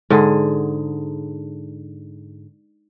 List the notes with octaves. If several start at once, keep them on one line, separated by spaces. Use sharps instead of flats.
G#2 D3 G#4